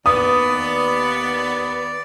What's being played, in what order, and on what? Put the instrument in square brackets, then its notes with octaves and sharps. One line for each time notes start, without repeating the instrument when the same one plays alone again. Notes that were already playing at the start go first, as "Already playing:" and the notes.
[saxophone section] D#2 B3 [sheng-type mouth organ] D5 [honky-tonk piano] D#6